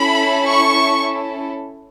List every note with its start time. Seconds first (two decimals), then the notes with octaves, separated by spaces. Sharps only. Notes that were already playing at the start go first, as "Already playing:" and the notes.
Already playing: C#4 E4 A4 B5
0.47 C#6